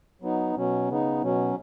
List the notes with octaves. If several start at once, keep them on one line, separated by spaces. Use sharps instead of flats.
F#3 B3 D#4
B2 F#3 C#4
C#3 B3 D#4
B2 F#3 C#4